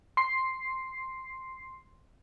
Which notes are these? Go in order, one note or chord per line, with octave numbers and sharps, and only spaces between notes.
C6 C7